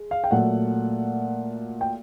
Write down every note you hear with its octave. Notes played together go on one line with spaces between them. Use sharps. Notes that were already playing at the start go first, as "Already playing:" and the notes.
Already playing: G#3
F5
G5
A#2 F#3 A3 F#5
G5